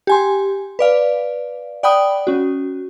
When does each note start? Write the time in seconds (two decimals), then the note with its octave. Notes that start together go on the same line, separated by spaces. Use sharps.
0.07 G4 G#5 C6
0.79 B4 D5 F5
1.83 D5 F#5 G5 B5 D#6
2.27 C#4 F#4